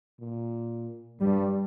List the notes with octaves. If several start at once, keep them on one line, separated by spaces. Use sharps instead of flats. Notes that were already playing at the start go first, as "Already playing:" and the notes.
A#2
G2 G3